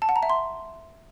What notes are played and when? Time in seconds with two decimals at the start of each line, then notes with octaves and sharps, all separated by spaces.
0.02 A5
0.09 F#5
0.16 A#5
0.23 E5
0.29 C6